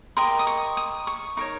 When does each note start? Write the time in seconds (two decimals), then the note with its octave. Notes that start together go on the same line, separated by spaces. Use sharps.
0.17 G4 A#4 D#5 C6
0.39 D#6
0.47 C#6
0.77 D#6
1.07 C#6
1.37 D#4 A#4 C#5 C#6